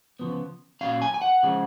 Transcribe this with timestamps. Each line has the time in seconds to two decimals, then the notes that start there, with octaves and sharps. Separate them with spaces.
0.19 C#3 F3 B3
0.81 A#2 F#3 C#4 F5
1.02 G#5
1.14 G#5
1.22 F#5
1.43 C#3 F3 G#3